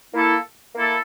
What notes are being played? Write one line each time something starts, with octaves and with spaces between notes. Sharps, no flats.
A#3 E4 A4
A#3 E4 A4